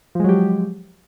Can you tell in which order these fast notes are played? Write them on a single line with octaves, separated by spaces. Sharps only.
F3 G#3 F#3 G4